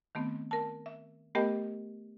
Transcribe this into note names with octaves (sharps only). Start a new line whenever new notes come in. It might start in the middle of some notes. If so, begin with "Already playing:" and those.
D#3 A3 B3 C4
A#4 A5
E5
A3 B3 G4 A#4 D#5 G5